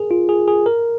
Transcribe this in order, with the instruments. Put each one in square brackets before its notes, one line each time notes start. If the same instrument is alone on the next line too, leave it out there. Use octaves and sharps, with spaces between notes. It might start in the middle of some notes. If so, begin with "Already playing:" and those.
Already playing: [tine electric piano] G#4 A#4
F4
G#4
G#4
A#4